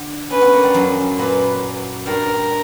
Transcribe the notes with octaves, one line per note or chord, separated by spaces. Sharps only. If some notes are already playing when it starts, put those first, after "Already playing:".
Already playing: D3
C#4 B4
B3
A#3
G3
F#2 F#3
A#2 A#3 B4
G2 G3 A#4